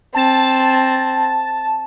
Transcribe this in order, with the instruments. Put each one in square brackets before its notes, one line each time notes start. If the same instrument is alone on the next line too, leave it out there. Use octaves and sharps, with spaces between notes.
[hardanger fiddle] C4 [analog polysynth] A5